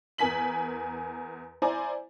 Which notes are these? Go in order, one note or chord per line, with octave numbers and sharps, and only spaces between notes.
E2 A#4 G#5 B6 F#7
E4 C5 D5 G#5 A#5